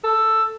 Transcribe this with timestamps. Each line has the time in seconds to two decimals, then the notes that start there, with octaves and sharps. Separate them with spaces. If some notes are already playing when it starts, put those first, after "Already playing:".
0.04 A4